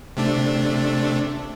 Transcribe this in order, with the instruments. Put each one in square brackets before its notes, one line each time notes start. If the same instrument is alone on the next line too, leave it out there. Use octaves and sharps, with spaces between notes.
[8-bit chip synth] C3 A3 D4